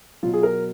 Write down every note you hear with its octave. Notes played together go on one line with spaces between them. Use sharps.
B2 F#3 F4
G#4
A#4